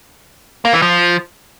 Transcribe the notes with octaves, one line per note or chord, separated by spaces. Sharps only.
A#3
E3
F3